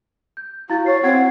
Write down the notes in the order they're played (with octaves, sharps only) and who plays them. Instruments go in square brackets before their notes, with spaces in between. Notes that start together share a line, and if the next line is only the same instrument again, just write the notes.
[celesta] G6
[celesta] E4 F5 A6 [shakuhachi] F#4
[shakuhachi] C#5 [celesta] C#6 C7
[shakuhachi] C4 [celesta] F#5 G#6 C7